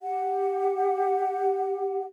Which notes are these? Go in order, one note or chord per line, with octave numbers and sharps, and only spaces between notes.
G4 F#5